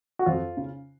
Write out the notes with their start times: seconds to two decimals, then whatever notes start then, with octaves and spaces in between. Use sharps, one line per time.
0.19 F#4
0.26 F2 F4
0.57 C#3